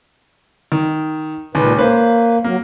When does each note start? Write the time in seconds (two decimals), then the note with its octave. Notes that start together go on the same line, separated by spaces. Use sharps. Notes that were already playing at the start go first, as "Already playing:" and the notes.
0.72 D#3
1.55 C#2 A#2 D#3 B4
1.77 A#3 C#4 B4 C5
2.44 F#3 A#3